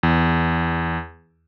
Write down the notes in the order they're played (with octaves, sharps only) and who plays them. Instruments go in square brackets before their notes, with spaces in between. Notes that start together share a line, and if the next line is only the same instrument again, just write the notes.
[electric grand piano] E2